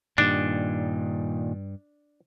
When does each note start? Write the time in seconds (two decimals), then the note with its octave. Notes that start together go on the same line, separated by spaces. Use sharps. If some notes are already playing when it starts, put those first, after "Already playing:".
0.18 G2 A#2 D#3 D4